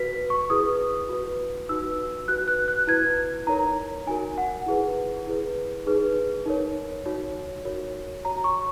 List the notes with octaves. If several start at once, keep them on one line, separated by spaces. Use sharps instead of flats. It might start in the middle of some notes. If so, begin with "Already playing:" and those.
Already playing: F#4 B4 B6
C#6
E4 G#4 B4 D#6
F#4 B4
D#4 F#4 B4 E6
F#4 B4 F#6
F#6
F#6
E4 B4 G#6
D#4 A#4 C#5 A#5
D#4 F#4 A#4 G#5
F#5
E4 G#4 B4
E4 G#4 B4
D#4 G#4 B4
D#4 A#4 C#5
D#4 F#4 C#5
F#4 A#4 C#5
F#4 C#5 A#5
C#6